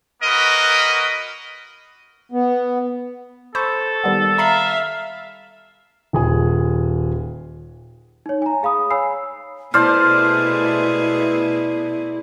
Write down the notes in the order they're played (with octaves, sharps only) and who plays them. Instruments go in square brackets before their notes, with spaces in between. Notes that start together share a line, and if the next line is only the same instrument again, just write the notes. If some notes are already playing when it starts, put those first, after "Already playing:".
[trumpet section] A#3 F#4 A#4 B4 D#5
[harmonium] B3
[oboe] A4 [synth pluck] C5 B5 C#6
[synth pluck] D#3 G3 B3
[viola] E5 F5 [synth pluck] A#5 B5 C7
[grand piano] D#1 G#4 G#5
[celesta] D#4 C#5
G#5 A#5
G#4 F5 B5 D#6
C#5 G#5 B5 E6 C7
[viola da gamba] B2 A3 G#4 [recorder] E4 [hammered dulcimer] C5 D5 A5 [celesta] F6